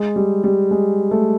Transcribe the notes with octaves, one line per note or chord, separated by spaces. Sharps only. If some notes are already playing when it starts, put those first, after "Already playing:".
Already playing: G#3
G3
G3
G#3
A3